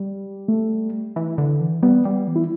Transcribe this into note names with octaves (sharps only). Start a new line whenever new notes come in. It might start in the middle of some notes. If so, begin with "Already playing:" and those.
Already playing: G3
A3
E3
D3
E3
G3 B3
G3
E3
E4